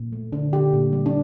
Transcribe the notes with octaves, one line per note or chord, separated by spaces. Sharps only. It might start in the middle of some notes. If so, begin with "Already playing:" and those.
Already playing: A#2
A3
D3 D4
D3 G4
A#2
G3
D4